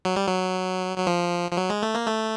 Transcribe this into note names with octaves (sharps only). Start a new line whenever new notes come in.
F#3
G3
F#3
F#3
F3
F3
F#3
G#3
A3
A#3
A3